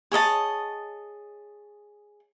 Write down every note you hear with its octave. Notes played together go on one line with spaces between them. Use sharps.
G#4 C#5 D#5 A5